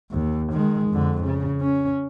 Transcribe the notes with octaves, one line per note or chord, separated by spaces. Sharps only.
D#2
D#3 G#3
F2 D3
C#3
C#4